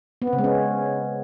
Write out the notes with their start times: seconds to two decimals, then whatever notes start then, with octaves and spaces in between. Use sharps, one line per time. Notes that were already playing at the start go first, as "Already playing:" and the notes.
0.22 B3
0.27 C4
0.33 C#3
0.38 G#3
0.44 C#4